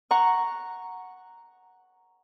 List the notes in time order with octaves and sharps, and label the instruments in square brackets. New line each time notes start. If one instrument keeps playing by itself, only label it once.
[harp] F#5 A#5 C#6